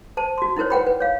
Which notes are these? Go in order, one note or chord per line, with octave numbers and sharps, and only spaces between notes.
C5 A5
F#4 C6
D#4 E4 A#4 C5 C#5
B4 F#5 G5 B5
B4
C#5 F5